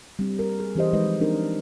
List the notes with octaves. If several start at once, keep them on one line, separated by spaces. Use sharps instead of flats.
G3 C4
A#4
G#4
E3 C4 G4 C5 D#5
E3 F3 G#3 D#4 B4 D#5
C4 D4 D#4 A#4